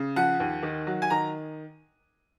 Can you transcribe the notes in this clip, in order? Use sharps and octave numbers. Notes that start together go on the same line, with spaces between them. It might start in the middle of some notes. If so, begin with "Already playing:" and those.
Already playing: C#3
F3 F#5
D#2
D#3
F#3
G#5
D#3 A#5